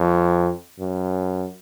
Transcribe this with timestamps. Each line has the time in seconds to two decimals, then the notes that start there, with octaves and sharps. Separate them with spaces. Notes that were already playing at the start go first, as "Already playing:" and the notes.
Already playing: F2
0.79 F#2